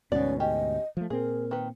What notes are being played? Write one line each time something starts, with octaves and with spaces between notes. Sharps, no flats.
D2 G#2 B2 B3 C#4 D5
C#4 G4 D#5
F3 A3
A#2 C4 G#4 A#4
D#3 B4